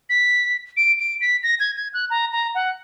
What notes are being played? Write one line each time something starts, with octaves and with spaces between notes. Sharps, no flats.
B6
D7
D7
B6
A#6
G#6
G#6
F#6
A#5
A#5
F#5